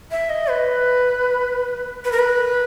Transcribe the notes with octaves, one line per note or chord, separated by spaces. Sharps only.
E5
D#5
B4
B4
A#4
B4